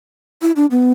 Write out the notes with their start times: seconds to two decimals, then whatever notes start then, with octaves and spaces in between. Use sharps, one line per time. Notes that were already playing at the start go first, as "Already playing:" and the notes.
0.42 E4
0.56 D4
0.71 B3